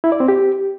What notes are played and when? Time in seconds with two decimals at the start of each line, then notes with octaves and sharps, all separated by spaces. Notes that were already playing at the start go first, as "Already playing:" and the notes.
0.04 E4
0.12 D5
0.20 C4
0.28 G4